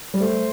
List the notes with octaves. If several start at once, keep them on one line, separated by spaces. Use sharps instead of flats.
G3
A3 C5